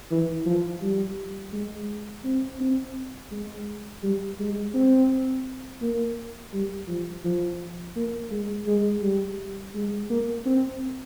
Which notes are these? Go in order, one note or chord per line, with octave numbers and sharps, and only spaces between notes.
E3
F3
G3
G#3
C4
C4
G#3
G3
G#3
C4
A#3
G3
F3
F3
A#3
G#3
G#3
G3
G#3
A#3
C4